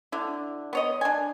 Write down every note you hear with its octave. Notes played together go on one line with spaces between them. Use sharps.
D3 E4
B3 C#5 D#5
D4 G#5